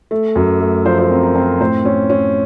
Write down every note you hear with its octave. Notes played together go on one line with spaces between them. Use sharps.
A3
F#2
A3
F3 C5
C5
A#4
C4
A#4
C4
A#4
A2 C5
C#4
C#4